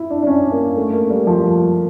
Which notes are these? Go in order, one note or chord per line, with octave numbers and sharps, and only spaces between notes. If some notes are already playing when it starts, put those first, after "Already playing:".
Already playing: E4
D4
D4
C#4
A#3
A3
A#3
G3
F3